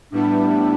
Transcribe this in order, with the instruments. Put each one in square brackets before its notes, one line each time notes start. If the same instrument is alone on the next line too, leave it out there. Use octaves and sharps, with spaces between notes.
[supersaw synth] A2 G3 B3 E4 [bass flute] D4